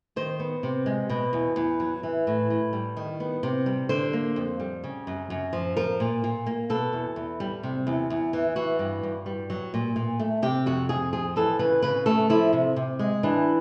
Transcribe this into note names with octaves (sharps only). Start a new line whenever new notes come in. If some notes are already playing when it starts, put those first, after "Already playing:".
D#3 C5
B3
C3
G#3
B2
E2
E2
F#3
E3
A2
A2
G3
D#3
B3
C3
G3
D3 C5
A#3
F2
G3
C#3
F#2
F#2
F3
F3 A#4
A#2
A#2
A#3
B2 A4
E2
E2
G3
C3
E2
E2
E3
E3 F#4
G2
G2
G3
F#3
A#2
A#2
A3
C3 G4
F2 F#4
F2 G#4
F3 G#4
E3 A4
C#3 B4
C#3 B4
A3 A4
F3 E4
C3
C3
G#3
E3 D4